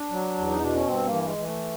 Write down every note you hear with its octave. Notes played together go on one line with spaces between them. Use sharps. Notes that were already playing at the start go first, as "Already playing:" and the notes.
Already playing: D4
F#3
E2
D#4
B2 D4
C#4
G2 C4
A#3
E3
G#3
E3
A3